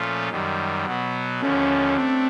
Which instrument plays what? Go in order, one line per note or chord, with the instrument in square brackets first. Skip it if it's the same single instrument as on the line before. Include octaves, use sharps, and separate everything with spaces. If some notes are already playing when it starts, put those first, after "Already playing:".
Already playing: [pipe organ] A#2 F3 A3 C#4 F4
F#2 D#3 G3
B2 F#3 B3
[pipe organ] D#2 D3 F3 A3 [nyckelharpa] C#4
[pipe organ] A3 D4 [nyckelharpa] C4